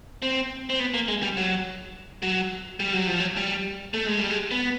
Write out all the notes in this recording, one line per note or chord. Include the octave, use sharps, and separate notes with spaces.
C4
C4
B3
A#3
G#3
G3
F#3
F#3
G3
F#3
F3
F#3
G3
A3
G#3
G3
G#3
B3